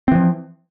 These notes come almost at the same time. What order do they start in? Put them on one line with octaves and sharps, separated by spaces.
C4 E3 F3